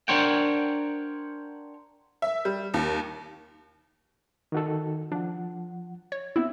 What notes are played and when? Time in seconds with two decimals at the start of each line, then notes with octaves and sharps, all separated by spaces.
0.08 D4 A#4 C5 C#5 F#5 G5
2.22 E5
2.45 G3
2.74 D#2
4.52 D#3 F#4 A4
5.12 F3 D4 F#5
6.12 C#5
6.36 B3 C4 E4 E5 E6